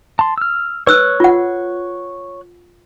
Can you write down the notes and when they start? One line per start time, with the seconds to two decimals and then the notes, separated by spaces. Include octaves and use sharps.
0.19 A5 C6
0.38 E6 F6
0.87 B4 C#5 E6 F#6
1.20 F4 F#5